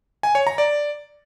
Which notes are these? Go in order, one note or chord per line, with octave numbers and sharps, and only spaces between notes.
G#5
C#5
A#5
D5